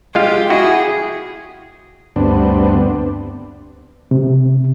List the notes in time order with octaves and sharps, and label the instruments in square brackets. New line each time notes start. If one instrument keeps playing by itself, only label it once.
[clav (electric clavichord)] G#3 F4 F5 [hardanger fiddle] G4
[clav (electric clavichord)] E4 F#4 [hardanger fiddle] G#4
[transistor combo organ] D2 G2 B3 C4 D4
[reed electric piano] C3